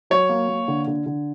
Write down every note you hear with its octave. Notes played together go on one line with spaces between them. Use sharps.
F#3 C#5
A#3
A#3
D3
D3
D3